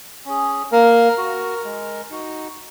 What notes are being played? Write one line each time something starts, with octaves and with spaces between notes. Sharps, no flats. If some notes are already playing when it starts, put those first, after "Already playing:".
C#4 G#4
A#3 A#4
F#4
G#3
D#4 F#4